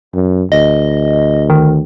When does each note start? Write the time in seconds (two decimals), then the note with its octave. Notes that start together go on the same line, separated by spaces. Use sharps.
0.15 F#2
0.52 D2 D#5
1.50 D#3